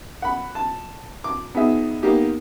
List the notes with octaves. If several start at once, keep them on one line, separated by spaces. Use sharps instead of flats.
F#5 B5
A5
D6
B3 D#4 G#4 E5
A#3 B3 D#4 G4